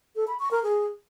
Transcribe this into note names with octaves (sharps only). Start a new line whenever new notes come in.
A4
B5
C#6
A#4
G#4